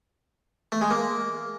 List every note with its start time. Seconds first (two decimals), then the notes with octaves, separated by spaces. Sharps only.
0.72 A3
0.81 G#3
0.91 A#3